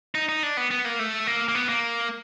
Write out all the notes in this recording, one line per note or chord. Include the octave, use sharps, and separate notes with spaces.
D#4
D#4
D4
B3
B3
A#3
A3
A#3
A#3
B3
A#3